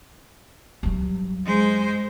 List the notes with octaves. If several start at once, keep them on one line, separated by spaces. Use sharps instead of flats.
G2 F#3
G#3 C5